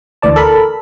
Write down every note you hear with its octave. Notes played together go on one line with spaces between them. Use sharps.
D2 E3 D5 A5
A4 A#4 B5